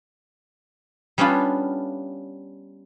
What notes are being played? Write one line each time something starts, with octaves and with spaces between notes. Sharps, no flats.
G3 B3 C#4 D4 F4